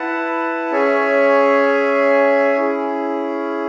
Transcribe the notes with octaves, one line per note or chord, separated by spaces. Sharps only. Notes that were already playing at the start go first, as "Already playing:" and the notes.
Already playing: E4 B4 F#5 A5
C#4 G#4 C#5 E5 G#5
C#4 E4 G#4